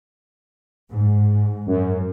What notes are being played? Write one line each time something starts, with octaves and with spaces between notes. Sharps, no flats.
G#2
F#2